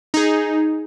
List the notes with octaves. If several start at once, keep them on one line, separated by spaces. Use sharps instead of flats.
D#4 G#4